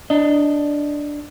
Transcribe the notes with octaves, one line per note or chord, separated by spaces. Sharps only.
D4 D#5